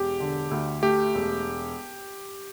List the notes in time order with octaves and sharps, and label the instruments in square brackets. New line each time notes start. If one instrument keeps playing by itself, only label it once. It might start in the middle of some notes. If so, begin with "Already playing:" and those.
Already playing: [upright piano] E1 [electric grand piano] G4
[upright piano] D3
D2
[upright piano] A3 [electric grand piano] G4
[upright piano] E1